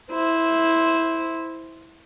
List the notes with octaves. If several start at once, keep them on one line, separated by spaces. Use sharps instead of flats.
E4 C5